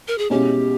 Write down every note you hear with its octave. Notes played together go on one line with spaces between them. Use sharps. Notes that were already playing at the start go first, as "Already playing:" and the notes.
A#4
G#4
B2 G#3 C#4 E4 G4